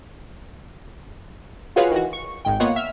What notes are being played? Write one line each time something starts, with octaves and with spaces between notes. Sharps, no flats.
F4 F#4 G#4 B4 C#5 F5
D#3 E3 F#4
C#6
G#1 G#2 G5
A#3 B3 F4 C#5 D#5 F#5
E5 F6